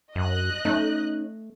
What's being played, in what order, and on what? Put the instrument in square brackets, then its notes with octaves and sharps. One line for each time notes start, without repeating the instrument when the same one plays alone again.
[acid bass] F#2 [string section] D#5 F#6
[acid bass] A3 [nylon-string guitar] C#4 D#4